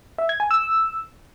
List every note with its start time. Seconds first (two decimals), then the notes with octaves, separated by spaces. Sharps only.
0.18 E5
0.29 G#6
0.40 G#5
0.51 E6